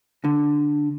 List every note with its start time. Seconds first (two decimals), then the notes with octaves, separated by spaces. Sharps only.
0.24 D3